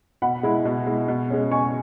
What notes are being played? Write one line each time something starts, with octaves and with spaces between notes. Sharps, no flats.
B2 F#5 B5
G#3 E4
B2
G#3 E4
B2
G#3 C#4
B2 G#5 C#6